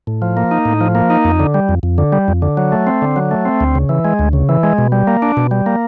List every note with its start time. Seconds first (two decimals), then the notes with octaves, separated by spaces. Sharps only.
0.07 A2
0.22 F3
0.37 A#3
0.51 D#4
0.65 A2
0.81 F3
0.95 A#3
1.10 D#4
1.25 F2
1.40 D3
1.54 G3
1.69 F2
1.83 F2
1.98 D3
2.12 G3
2.28 F2
2.42 D3
2.57 F#3
2.72 A3
2.87 C4
3.02 D3
3.16 F#3
3.31 A3
3.45 C4
3.60 D2
3.75 C#3
3.89 E3
4.05 G#3
4.19 D2
4.33 C#3
4.49 E3
4.63 G#3
4.78 B2
4.92 G3
5.07 A#3
5.22 D4
5.37 B2
5.51 G3
5.66 A#3